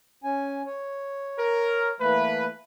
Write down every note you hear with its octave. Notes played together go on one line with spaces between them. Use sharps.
C#4 G#5
C#5
A#4
E3 A3 A#3 B4